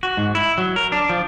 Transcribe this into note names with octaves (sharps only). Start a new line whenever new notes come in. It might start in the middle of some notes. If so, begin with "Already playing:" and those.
F#4
G#2
E4
F#3
A#4
D4
F3